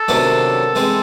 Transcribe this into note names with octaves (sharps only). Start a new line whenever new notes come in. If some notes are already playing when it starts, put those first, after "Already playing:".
Already playing: A4
C3 D#3 F#3 B3 D4
E3 G#3 C4